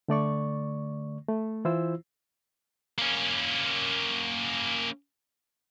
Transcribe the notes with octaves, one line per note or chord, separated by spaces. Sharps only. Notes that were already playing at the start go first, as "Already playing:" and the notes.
D3 A3 D5 C#6
A3
E3 E4 F4 C5 E6
A#3 C#4